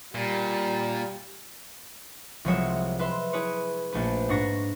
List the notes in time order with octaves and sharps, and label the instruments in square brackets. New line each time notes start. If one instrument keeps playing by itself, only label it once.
[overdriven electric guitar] A#2 [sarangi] G3
[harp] C2 F3 F#3 G#3 C#5 E5
B4 E5 C6
E4 G#4 B4 C#5
A#1 A3 B4
G#2 D4 C#6 A#6